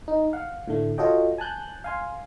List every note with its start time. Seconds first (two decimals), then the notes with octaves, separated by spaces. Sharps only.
0.08 D#4
0.33 F5 F#5
0.68 A2 D3 A3
0.98 F4 F#4 A4 C#5 D#5 G5
1.38 G#5 A5 F#6 G6
1.84 F5 G#5 C6